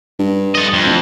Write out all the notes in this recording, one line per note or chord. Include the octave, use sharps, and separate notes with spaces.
G2
A4 D#5
F2
D1